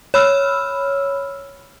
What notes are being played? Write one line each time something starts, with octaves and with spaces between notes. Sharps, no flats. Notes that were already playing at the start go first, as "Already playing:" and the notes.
C#5 B5 E6 F6